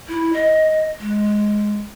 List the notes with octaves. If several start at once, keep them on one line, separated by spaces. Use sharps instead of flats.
E4
D#5
G#3